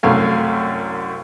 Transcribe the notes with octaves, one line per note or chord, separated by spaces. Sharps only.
C2 F#2 A3 F5